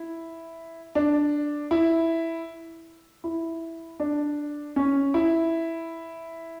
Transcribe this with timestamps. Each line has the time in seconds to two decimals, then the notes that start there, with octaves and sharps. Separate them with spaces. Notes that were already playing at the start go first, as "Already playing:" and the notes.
Already playing: E4
0.95 D4
1.71 E4
3.24 E4
4.00 D4
4.76 C#4
5.14 E4